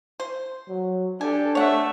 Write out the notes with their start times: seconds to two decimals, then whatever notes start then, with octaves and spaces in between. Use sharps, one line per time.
0.20 C5
0.68 F#3
1.21 D4 G4 A4 G#5
1.55 A3 C#5 E5 F#5